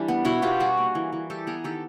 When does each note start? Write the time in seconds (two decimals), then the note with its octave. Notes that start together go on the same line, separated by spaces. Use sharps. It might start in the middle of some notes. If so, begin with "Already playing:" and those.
Already playing: E3 G3 D4
0.08 B3
0.25 B2 E4 F#4
0.42 B2 F4 G4
0.60 G3 F#4 G#4
0.78 A#3
0.95 E3
1.12 E3
1.30 G3 G4 A4
1.47 B3 G#4 A#4
1.64 D#3 G4 A4